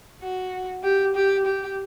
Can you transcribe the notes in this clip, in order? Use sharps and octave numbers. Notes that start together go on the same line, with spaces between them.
F#4
G4
G4
G4